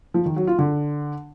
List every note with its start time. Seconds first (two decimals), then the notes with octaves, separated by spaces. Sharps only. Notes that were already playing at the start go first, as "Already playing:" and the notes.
0.14 F3
0.25 D#3
0.36 F#3
0.47 F4
0.58 D3